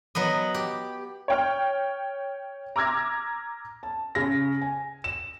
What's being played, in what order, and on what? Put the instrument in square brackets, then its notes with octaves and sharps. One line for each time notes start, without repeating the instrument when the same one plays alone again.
[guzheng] F#3 B3 B4 D#5
G4
[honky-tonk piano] C#5 G5 F6
A#5 D6 E6 F6 G#6 A#6
[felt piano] A5
C#3 A#6
G#5
E7